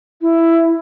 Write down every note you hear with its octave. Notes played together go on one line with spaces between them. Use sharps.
E4